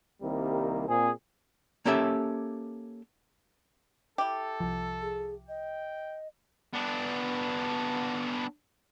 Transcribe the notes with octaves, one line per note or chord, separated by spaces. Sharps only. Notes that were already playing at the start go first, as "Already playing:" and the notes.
C2 C3 D#3 G3 A#3 A#4
A#2 C4 G#4
A#3 C#4 G4 A4 E5
E4 G4 A4
C2 F3
G#4
D#5 G5
B3 D4